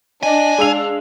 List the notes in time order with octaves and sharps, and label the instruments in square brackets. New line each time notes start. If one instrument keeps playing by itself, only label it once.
[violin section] D4 [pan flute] D#5 [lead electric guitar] G#5
[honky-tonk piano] G#3 E6 F7 [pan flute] F5